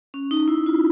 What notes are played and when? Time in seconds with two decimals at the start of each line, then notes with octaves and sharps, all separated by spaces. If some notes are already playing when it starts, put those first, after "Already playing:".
0.14 C#4
0.31 D#4
0.48 E4
0.66 F4